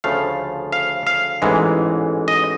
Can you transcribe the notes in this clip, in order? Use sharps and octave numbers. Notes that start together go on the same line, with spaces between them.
D2 C#3 F3 A3 F5
F5
F5
A1 G#2 E3 G#3
D#5